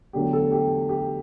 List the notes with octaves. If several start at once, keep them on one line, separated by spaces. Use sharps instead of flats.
E2 D3 F#3 A3 G4
A4
G4
G4